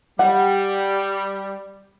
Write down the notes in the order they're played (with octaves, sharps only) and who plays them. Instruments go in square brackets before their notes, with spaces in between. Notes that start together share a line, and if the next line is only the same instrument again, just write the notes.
[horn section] G3 [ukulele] F#5